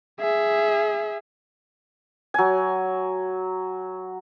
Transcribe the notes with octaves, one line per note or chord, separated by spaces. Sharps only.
G#4 E5
F#3 G#5